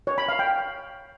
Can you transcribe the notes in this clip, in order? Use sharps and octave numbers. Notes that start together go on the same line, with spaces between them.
C#5
B5
F5
G5